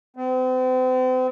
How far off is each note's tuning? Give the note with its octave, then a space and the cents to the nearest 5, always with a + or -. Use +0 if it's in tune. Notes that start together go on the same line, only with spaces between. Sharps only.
C4 -40